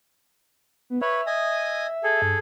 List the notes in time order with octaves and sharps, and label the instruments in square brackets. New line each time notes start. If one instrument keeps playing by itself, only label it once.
[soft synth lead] B3
[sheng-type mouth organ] B4 C#5 [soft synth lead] E5
[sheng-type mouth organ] D#5 G#5 D#6
G#4 A4
[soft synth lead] G2